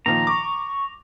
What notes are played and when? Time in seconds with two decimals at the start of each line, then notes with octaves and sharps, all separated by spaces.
0.06 A#2 D#3 F3 A#5
0.27 C#6 D6